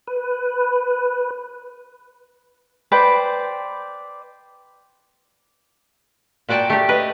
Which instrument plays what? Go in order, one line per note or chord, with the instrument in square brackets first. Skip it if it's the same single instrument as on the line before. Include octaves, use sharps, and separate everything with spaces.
[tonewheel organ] B4
[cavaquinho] B4 C5 D5 G5
[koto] A#2 F#4 D5 G5 A5
A3 G4
B4 D#5